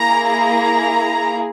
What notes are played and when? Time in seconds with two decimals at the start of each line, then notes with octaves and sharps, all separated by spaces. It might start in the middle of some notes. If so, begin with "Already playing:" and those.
Already playing: A#3 E4 G#4 A#5
0.30 A#5